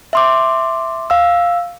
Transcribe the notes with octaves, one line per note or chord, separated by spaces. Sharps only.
E5 C6 D6
F5 E6